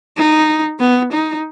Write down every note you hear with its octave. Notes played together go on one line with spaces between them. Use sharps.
D#4
B3
D#4